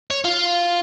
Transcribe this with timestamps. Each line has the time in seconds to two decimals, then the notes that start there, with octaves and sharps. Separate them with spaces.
0.11 C#5
0.25 F4